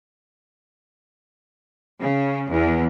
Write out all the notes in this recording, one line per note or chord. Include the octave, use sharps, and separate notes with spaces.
C#3
E2